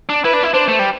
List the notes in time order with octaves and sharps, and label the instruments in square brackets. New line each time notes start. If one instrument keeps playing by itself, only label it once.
[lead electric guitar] D4
[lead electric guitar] E4 [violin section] B4
[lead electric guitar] D4
E4
[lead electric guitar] D4 [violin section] C5
[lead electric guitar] A3
G3